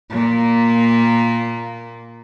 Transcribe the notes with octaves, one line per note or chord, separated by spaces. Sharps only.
A#2 A#3